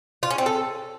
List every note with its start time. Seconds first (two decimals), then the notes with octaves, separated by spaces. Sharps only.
0.23 F4
0.31 C#4
0.38 C4
0.46 A4